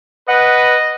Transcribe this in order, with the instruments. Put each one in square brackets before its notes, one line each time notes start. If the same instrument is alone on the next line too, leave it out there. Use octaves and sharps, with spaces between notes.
[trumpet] B4 [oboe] D#5 [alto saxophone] F#5